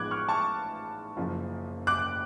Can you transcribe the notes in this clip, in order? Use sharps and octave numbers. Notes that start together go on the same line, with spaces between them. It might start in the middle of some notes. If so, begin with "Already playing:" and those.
Already playing: A1 G#2 F3 G#3 B3 D6 F#6 G#6
C#6 F6
A5 C#6
F#1 F#2 F3
D6 F#6